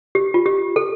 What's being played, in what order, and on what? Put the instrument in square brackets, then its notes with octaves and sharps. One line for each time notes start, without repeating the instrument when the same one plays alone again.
[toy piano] G4
F4
G4
A4